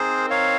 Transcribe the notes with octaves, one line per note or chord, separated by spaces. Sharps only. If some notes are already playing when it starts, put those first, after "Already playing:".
Already playing: C4 D#4 G#4 A#4 C5
C#5 F5